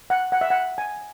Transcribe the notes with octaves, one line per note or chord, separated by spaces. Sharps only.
F#5
F#5
E5
F#5
G#5